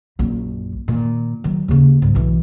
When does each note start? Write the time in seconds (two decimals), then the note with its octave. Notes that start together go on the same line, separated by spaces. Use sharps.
0.19 A#1 F#2
0.88 A#2 D#3
1.44 D#3 F#3
1.68 D#2 C#3
2.02 G#2 G3
2.15 B1 E3